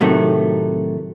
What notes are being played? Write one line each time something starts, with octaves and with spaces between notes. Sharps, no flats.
A2 C3 D#3 F#3 A3